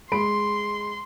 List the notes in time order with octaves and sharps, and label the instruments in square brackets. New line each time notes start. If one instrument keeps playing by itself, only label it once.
[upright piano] G#3 B5 D7 [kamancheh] C6